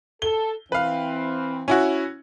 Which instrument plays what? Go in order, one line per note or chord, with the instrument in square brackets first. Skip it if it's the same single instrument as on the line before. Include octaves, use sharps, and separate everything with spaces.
[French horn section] A4 [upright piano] G7
[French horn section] E3 C4 [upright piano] B4 F5
[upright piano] C#4 E4 F#4